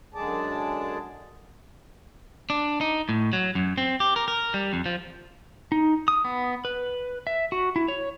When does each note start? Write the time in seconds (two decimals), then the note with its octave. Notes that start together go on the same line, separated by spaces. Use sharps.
0.14 F#2 D3 G#3 G#4 D5 A5
2.50 D4
2.81 D#4
3.09 A2
3.33 F#3
3.55 F#2
3.78 C4
4.00 G4
4.16 A#4
4.28 A#4
4.54 G3
4.73 F2
4.86 F3
5.72 D#4
6.08 D#6
6.25 B3
6.65 B4
7.27 E5
7.52 F#4
7.76 E4
7.88 C#5